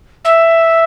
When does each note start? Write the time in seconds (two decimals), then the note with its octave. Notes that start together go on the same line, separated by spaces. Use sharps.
0.24 E5